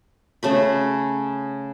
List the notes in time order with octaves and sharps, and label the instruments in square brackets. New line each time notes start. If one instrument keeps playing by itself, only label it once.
[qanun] C#3 A3 B5